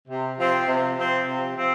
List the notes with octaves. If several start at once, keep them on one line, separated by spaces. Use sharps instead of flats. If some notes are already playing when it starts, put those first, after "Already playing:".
C3
F3 C4
C3
F3 C4
C3
F3 C4